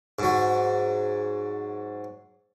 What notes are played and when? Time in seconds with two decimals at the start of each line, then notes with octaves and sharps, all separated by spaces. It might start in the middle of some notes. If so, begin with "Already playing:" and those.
0.19 G#2 F#3